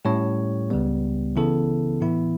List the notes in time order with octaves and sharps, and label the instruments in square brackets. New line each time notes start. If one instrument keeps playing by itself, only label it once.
[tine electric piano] A2 G3 C#4 G4 C#5
C#2 C#3 G3 B3
C#3 E3 B3 E4 A4
A2 E3 B3 E4